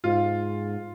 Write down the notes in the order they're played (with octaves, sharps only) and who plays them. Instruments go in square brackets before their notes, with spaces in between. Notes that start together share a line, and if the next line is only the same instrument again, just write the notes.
[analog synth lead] G#2 [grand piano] F4